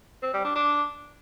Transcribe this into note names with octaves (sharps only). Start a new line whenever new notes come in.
C4
G3
D4
D4